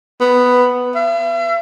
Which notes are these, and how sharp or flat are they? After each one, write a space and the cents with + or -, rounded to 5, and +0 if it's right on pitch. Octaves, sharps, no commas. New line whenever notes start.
B3 +5
E5 +45